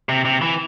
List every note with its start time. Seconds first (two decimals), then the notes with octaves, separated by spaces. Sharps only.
0.09 C3
0.25 C3
0.42 E3